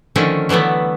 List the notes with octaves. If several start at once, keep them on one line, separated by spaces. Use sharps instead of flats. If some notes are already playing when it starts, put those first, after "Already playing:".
D3 D#3 F3 A3 C#4
D3 E3 F#3 A3 B3